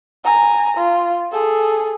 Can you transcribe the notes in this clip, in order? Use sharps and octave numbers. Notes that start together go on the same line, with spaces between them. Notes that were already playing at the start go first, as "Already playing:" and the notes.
G#5 A#5
F4
G#4 A4